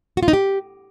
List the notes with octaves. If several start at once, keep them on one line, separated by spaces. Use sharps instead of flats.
F#4
F4
D#4
G4